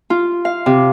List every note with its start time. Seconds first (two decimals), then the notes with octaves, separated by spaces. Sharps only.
0.10 F4
0.45 F5
0.66 C3